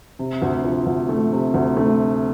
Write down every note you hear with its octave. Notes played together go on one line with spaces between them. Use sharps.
C3
D2
F3
D2
A3
C3
D2
A3